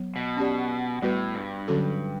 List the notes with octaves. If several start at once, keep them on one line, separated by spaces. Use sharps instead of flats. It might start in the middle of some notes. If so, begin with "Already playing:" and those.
Already playing: F#3 B3
B2
C#4 G4 D5
A2 G3 B3 F#4 B4
G2
D3 F#3 C#4 F#4 A4